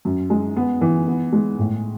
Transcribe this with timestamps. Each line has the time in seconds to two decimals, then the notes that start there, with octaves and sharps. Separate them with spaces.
0.05 F#2
0.30 G#3
0.56 B3
0.81 E3
1.07 B3
1.33 G#3
1.58 A2